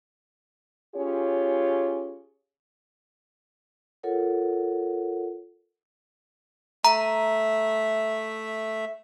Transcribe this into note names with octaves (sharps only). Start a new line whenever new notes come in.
C#4 F4 G4 G#4 C#5
F4 A4 A#4 C#5 F#5
A3 E5 A#5